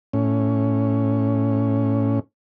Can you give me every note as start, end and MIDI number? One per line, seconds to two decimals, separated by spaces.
0.13 2.19 45
0.13 2.19 61